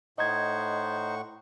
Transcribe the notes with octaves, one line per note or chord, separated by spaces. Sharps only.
A2 D#4 C5 D#5 F#5 C#6 G#6